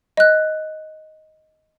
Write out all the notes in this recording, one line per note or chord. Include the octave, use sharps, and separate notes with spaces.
D#5 F#6